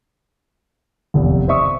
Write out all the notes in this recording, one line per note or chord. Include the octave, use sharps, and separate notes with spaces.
F1 A#1 E2
C5 D5 E5 C#6 D#6